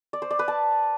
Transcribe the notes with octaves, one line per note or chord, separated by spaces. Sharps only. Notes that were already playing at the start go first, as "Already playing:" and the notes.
D5
C5
D5
B4
A5